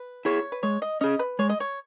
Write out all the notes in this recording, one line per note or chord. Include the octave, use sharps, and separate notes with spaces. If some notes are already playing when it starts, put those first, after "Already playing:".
Already playing: B4
E4 G#4 C#5
B4
G#3 C#5
D#5
C#4 G#4 D#5
B4
G#3 C#5
D#5
C#5